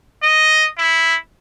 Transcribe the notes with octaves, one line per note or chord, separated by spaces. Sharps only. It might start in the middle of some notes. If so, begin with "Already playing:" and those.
D#5
E4